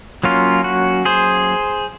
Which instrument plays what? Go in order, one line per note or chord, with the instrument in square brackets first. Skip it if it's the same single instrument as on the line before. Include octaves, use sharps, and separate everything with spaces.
[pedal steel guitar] F#3 A#3 C#4 F4
F#4
G#4 C5